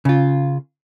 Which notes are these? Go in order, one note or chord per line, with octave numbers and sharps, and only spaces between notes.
C#3 F4